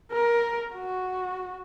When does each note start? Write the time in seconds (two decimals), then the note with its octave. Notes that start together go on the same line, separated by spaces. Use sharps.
0.11 A#4
0.73 F#4